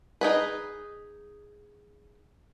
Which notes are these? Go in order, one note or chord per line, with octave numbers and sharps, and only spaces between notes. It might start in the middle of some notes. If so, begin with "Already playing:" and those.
D#4 G#4 B4